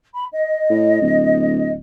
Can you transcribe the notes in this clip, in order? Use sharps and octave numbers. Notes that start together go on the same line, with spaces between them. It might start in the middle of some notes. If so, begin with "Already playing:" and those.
B5
D#5
A2
D1